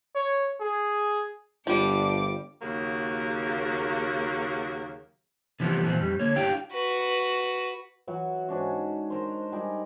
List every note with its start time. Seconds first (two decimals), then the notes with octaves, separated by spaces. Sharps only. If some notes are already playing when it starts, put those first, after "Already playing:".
0.15 C#5
0.61 G#4
1.67 G1 F3 G3 D4 D6
2.61 D#2 C#3 F#3 A#3 F#4
5.60 C3 E3 F3 G3 B3 E4
5.83 A#2 E3 F3 G3 B3 C4
6.00 F2 A2 G3
6.19 D3 A#3 C#5
6.36 D4 E4 G4 D5 F5 G5
6.73 F#4 B4
8.07 E3 F#3 F#4
8.48 G#2 C#4 D4 F#4
9.10 A#4 C5
9.52 G3 D#4 G#4 A#4